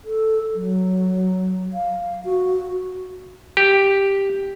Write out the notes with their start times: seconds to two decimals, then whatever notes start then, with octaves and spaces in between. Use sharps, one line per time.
0.05 A4
0.55 F#3
1.73 F5
2.25 F#4
3.57 G4